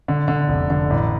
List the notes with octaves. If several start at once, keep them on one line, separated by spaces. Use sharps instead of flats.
D3
D3
F1
D3
A1